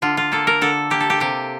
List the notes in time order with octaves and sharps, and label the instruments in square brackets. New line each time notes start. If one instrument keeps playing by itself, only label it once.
[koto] D3 F4
F4
A#3 A4
A#4
D3 A4
A#3 G4
A4
G4
C3 G4